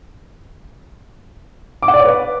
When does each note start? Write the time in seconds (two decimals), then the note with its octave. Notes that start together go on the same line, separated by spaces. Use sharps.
1.82 D6
1.88 F#5
1.94 D5
1.99 C#5
2.05 B4